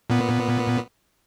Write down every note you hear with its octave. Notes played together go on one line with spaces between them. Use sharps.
A#2 B3